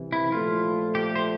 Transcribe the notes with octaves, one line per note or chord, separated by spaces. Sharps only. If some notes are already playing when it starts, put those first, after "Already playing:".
Already playing: C2 C3 E3
E4
A#2 F3 A3 F4
G4
C5